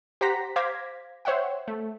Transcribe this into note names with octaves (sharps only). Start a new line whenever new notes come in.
G4 C5 F#5 A#5 A#6 B6
C5 F5 D6 G#6 A#6 B6
C5 C#5 E5 F#5 G5
A3